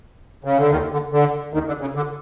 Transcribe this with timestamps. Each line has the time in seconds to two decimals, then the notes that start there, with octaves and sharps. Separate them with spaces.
0.44 C#3
0.58 D3
0.70 D#2 D#3
0.92 D3
1.12 D3
1.53 D#2 D#3
1.67 D3
1.81 C#3
1.95 D3